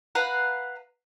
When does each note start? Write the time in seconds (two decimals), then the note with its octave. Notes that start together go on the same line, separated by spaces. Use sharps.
0.15 B4 F5 F#5 A#5